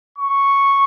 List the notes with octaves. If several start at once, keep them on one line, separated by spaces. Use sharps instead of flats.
C#6